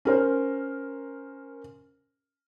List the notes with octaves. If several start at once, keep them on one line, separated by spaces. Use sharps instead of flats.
C#4 A#4 C5